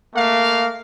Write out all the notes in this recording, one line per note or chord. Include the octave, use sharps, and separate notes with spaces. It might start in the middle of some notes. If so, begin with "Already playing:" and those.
A3 A#3 F5